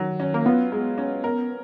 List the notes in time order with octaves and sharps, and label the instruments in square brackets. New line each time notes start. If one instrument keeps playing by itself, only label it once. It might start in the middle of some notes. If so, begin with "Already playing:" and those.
Already playing: [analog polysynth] D#3 [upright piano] F#3
[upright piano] C#4
[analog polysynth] A#3
[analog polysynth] B3 [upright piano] F4
[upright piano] G#3
C#4
A#4